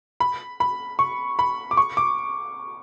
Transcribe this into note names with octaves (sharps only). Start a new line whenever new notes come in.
B5
B5
C#6
B5
D6
C#6
D6